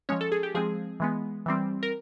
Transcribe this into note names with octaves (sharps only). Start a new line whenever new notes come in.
F3 G#3 C#4 C#5
A4
G#4
G4
F3 G#3 C4 G#4
E3 G#3 B3
E3 G3 C4
A#4